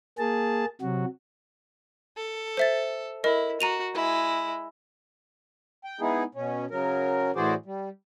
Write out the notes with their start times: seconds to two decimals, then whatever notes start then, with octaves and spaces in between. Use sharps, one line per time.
0.18 A#3 G#4 A5
0.81 C3 F#3 F#4
2.17 A4
2.57 C5 E5 A6
3.24 E4 A#4 D#5
3.61 F#4 A#5 D#7 F7
3.95 G#3 E4
5.84 G5
6.01 G#3 B3 D#4 E4 G#4
6.35 B2 C#4
6.71 C#3 F#3 A#4
7.36 A2 E3 F#4 G#4 C5 D5
7.66 G3